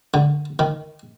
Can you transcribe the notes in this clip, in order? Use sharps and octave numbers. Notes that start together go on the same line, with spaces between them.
D3
D#3